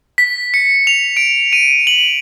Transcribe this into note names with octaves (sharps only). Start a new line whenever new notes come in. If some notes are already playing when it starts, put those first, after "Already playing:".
B6
C#7
F7
D7
D#7
F#7